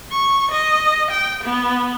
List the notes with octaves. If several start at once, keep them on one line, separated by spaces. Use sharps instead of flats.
C#6
D#5
G5
B3